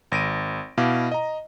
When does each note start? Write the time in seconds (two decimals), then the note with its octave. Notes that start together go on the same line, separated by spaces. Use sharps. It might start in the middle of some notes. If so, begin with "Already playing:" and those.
0.12 G#1 A#6 D7 D#7
0.78 B2 E4 F5 D6
1.12 D#5 A#5